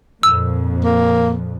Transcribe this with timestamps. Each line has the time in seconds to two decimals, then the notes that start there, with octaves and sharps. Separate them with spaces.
0.23 F2 A#2 E6
0.84 A#3